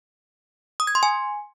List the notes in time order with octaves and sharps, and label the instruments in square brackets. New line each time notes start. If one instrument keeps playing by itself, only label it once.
[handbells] D#6
G#6
C6
G#5